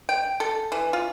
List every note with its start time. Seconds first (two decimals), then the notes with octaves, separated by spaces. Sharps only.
0.09 G5
0.40 A4
0.72 E3
0.93 F4